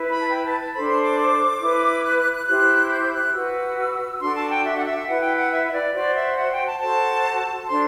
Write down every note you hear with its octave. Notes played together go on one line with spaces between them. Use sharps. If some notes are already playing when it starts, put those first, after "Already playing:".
Already playing: E4 B4
B5
A5
G5
A5
A5
D4 A4 C5 B5
C6
D6
E4 B4
F#6
F#6
F#6
E4 G4 C5 F#6
G6
F#6
F#4 B4 E6
D4 F#4 A4 C6
A5
G5
E5
F#5
E5
E4 B4 F#5
G5
F#5
E5
E5
D5
F#4 C5 D5
E5
F#5
G5
A5
F#4 A4 C5 A5
D4 A4 C5 C6